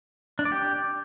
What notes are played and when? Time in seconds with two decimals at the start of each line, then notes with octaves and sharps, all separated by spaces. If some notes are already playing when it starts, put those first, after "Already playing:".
0.39 D4
0.45 D5
0.52 G4